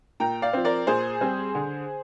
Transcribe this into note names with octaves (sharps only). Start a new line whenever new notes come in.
A#2 G5 A#5
D5 F5
F3 C4
A#4 D5
A#2 G#4 C5
G3 C4
D3